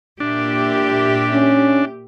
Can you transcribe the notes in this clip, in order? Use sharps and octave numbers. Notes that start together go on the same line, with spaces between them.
A#2 D4 G4 E5
C#4